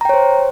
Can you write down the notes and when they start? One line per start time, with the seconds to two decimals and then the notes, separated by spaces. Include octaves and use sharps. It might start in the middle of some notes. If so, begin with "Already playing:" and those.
0.01 A#5
0.05 G5
0.09 C#5
0.14 C5